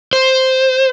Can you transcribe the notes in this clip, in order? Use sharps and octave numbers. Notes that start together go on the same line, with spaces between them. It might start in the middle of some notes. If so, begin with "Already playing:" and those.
C5